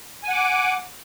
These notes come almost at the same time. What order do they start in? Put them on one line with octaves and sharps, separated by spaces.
G#5 F#5 D6